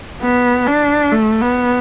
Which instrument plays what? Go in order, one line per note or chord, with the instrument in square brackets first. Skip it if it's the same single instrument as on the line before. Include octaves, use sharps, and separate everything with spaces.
[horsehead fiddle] B3
D4
A3
B3